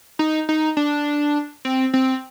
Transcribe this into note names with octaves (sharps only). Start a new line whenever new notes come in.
D#4
D#4
D4
C4
C4